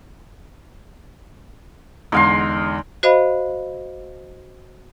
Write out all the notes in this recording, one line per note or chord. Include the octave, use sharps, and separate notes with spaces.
E2 D3 G#3 D#4 F5 C6
F#4 C5 D#5 F5 B5